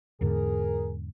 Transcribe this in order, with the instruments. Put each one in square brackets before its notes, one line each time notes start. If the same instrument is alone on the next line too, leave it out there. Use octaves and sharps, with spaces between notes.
[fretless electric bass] E2 G#2 D3 [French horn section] G#4 A#4